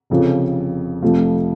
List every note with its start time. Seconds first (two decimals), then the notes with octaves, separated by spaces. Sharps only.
0.10 F1 F2 C#3 F3
1.02 F1 F2 F3 A3